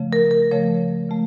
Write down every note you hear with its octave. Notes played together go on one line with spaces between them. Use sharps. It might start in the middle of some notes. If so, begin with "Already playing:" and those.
Already playing: C#3 F3 A3
A#4
A#4
C#3 F3 A3 C#5
C#3 F3 A3